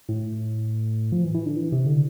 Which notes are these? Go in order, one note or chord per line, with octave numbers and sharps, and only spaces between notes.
A2
F3
E3
E3
D3
E3
C3
D3